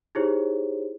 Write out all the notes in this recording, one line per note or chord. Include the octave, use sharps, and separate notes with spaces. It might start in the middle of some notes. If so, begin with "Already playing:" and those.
D#4 E4 G4 G#4 C5 C#5